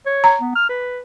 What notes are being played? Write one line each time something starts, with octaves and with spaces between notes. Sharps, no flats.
C#5
A#5
B3
F6
B4